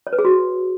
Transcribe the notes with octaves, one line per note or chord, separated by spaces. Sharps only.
C#5
B4
G#4
F#4